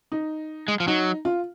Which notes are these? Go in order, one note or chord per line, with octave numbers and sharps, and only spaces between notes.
D#4
G#3
F3
F#3 D#4
F4